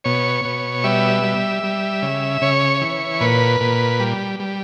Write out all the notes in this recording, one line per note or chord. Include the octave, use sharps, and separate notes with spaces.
B2 C#5
B2
G3 E5
G3
G3
C#3
C#3 C#5
E3
A#2 B4
A#2
G3
G3